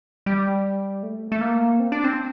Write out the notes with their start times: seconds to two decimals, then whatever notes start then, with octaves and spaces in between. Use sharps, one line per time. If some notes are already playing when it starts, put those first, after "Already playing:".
0.26 G3
1.03 A3
1.32 A3
1.41 A#3
1.80 C4
1.92 D4
2.04 C4